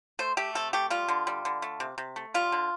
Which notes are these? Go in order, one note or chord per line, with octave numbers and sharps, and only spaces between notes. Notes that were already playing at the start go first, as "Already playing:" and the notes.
A3 C5
A3 G4
C3 A4
A3 G4
G3 F4
D3
G3
D3
A3
C3
C3
A3
G3 F4
D3